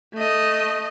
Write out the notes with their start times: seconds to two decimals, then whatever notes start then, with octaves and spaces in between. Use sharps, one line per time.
0.14 A3 D#5